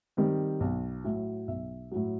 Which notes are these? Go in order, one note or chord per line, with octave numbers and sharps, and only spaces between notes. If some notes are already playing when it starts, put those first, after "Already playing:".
D#3 G3 C4
B1
A2 F#3
B1 E5
A2 F#3